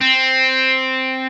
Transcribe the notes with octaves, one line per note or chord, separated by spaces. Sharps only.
C4